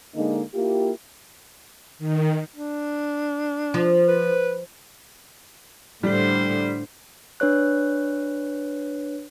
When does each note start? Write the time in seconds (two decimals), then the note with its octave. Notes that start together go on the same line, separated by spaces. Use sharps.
0.15 D3 G#3 A#3 D#4
0.55 A#3 E4 F4 G4
1.99 D#3
2.56 D4
3.74 F3
4.08 B4
6.03 A2 D3 G3 C5
7.40 D4 B4 C#5 F#6